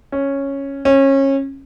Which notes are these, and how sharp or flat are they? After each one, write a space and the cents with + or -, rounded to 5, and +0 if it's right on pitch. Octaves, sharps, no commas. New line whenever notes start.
C#4 -5
C#4 -25